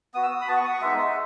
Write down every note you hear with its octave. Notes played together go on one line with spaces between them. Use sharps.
B3 F#4 D#6
E6
D#6
B5
B3 F#4 A5
C#6
D#6
C#6
G#3 B3 D#4 E5